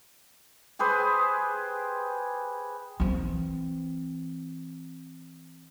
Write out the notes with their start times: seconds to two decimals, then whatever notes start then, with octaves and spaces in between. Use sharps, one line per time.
0.79 G4 G#4 B4 C5
3.00 E3 C4